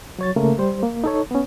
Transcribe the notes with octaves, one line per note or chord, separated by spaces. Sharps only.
F#3 C#5 A6
C#3 A3 A#3 A#4
G3 C5
A#3
D#4 A4 C#5
B3 C#4